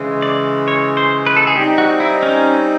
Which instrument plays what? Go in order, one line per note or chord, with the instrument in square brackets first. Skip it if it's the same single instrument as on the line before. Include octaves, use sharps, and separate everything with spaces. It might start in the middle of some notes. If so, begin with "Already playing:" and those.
Already playing: [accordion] C#3 E3 G#3
[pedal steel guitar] D5
C#5
C5
B4
A4
G#4
[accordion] G3 C4 D#4 [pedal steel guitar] G4
[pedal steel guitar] F#4
E4
C#4